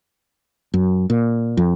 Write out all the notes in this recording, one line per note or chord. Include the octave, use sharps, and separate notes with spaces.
F#2
A#2
F2